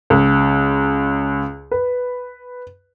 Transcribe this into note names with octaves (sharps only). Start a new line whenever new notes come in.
C#2
B4